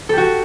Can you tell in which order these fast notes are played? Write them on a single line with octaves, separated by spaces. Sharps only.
A4 G4 F#4